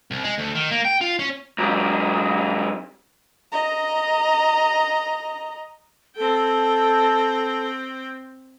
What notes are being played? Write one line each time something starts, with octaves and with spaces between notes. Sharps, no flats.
C2
G#3
D2
D#3
A#3
G5
F4
C#4
G#2 F#3
D#5 A#5
C4 A4 G5